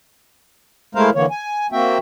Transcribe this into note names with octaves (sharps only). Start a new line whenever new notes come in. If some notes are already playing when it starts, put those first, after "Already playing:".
G#3 A3 E4 A#4 C5 F5
D3 E3 A#3 C#5
G#5
A#3 C4 F#4 E5 G5